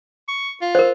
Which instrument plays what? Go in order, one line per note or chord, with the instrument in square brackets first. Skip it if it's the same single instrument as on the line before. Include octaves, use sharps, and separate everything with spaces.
[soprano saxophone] C#6
F4
[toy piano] A#4 C5